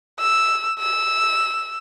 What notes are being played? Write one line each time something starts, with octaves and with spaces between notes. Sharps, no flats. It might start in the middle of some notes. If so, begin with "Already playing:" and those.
E6
E6